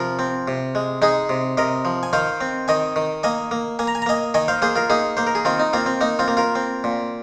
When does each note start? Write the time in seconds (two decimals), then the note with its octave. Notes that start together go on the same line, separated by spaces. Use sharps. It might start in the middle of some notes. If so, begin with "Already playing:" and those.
Already playing: C3 F3 F4 A#4
0.19 C4
0.48 C3
0.75 G#3
1.02 G#3 D#4 G#4
1.29 C3
1.57 C3 A#4 D#5
1.85 F3
2.03 G#5
2.13 D#3 C5 F5
2.41 C4
2.68 D#3 D#5 G#5
2.96 D#3
3.23 A#3 D#5 G#5
3.51 A#3
3.79 A#3 G#5
3.87 A#5
3.95 G#5
4.02 A#5
4.06 A#3 D#5 G#5
4.34 D#3 D#5 G#5
4.48 C5 F5
4.62 A#3 G#4 C5
4.75 F4 A#4
4.90 A#3 D#4 G#4
5.17 A#3 C5
5.27 A#4
5.35 G#4
5.45 D#3 C4 F4
5.59 D#4
5.73 A#3 C4 F4
5.86 C4
6.01 A#3 D#4
6.19 C4 F4
6.28 A#3
6.37 F4 A#4
6.55 C4
6.84 A#2